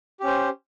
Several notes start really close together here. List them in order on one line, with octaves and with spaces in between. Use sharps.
G4 C#4 C5